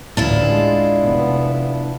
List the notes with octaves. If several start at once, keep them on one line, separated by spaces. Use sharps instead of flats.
A1 D2 D4 E4 F4
G#3
F1 B3